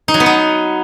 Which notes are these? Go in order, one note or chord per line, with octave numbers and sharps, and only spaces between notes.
D#4
F#3
B3
D#4